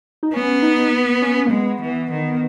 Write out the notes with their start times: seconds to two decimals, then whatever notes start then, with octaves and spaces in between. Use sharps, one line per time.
0.23 D#4
0.34 B3 C#4
0.62 D#4
1.22 C#4
1.46 A#3
1.51 G#3 B3
1.81 E3
2.11 D#3